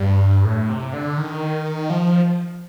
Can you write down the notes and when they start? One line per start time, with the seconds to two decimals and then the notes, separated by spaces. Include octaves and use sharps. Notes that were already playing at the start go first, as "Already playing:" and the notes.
Already playing: G2
0.45 A2
0.69 C3
0.93 D3
1.18 D#3
1.90 F3